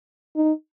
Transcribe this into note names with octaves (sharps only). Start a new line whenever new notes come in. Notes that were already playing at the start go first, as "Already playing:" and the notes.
D#4